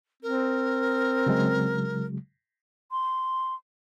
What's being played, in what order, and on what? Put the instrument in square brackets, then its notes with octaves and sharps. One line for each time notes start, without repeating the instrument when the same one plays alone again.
[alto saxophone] C4 [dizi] A#4
[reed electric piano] C#3 F#3 G#3
[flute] C6